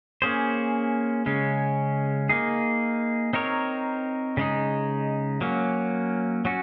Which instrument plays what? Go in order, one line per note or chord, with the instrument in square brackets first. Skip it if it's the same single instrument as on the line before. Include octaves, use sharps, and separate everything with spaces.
[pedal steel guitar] A#3 C#4 G#4 C5
C#3 G#3 C#4
A#3 D#4 G#4
C4 D#4 A#4 C#5
C#3 G#3 D#4
F#3 A#3 C#4
F#3 C#4 F#4